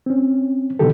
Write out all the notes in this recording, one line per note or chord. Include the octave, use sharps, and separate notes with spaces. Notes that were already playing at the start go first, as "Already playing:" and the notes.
C4 C#4
B2 D3 D#3 F#3 G4 A4